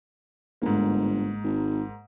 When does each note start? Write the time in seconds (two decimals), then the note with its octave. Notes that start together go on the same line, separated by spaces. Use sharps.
0.62 G1 G#2 A#3
1.43 G#1